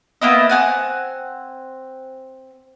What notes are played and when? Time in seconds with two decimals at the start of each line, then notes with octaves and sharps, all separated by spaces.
0.21 A#3 B3 E4 D#5
0.49 C4 C#4 F#5 G#5